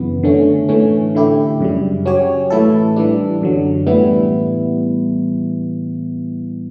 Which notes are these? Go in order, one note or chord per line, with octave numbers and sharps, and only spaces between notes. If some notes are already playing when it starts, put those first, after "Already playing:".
Already playing: F#2 C#3 E3 B3
D3 A3 C#4
A2 E3 A3 C#4
D3 A3 E4 G4
F#2 C#3 G3
F#3 C#4 G4 C#5
A2 E3 A3 E4 A4
E3 G3 D4
F#2 D3 F#3
A2 E3 G3 B3 E4